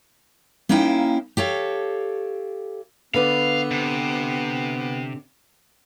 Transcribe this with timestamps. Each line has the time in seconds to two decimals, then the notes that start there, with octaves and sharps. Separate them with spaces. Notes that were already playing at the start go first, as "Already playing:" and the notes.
0.69 A#3 C#4 D#4 E4 F5 G5
1.37 G4 A4 C#5 F5
3.14 D3 B3 B4 D5 F5
3.71 C3